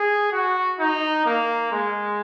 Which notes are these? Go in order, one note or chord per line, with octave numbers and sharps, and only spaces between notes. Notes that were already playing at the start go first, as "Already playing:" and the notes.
Already playing: G#4
F#4
D#4
A#3
G#3